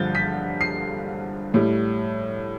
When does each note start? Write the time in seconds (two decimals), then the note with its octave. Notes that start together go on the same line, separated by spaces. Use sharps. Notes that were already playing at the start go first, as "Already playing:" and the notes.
Already playing: G2 D3 F3 G6 A6
0.15 B6
0.61 C7
1.54 A2 G3